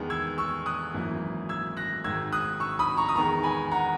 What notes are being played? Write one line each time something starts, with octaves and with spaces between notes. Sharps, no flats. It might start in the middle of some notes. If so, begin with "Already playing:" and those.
Already playing: E2 D#3 G#3 B3
E6 G#6
C#6 E6
D#6 F#6
G#1 F#2 E3 A#3
E6 G#6
F#6 A#6
G#1 G#2 D#3 E6 G#6
D#6 F#6
C#6 E6
B5 D#6
A#5 C#6
D#6
E2 D#3 G#3 B3 A#5 C#6
G#5 B5
F#5 A#5